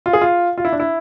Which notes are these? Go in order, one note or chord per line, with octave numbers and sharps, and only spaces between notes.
F4
G#4
F4
F4
E4
D4
E4